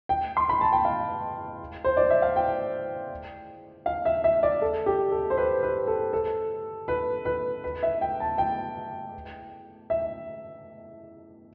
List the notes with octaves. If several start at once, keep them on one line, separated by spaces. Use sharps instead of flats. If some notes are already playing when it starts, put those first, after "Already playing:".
G5
C6
B5
A5
G5
F5
C5
D5
E5
F5
G5
F5
E5
E5
D5
A4
G4
A4
C5
B4
B4
A4
A4
B4
B4
B4
E5
G5
A5
G5
E5